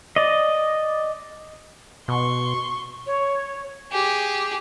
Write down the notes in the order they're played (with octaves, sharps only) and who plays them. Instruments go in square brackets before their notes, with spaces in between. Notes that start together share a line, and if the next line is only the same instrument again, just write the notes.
[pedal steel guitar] D5 D#5
[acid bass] B2 [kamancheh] C6 C#6
[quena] C#5
[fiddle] G4 G#4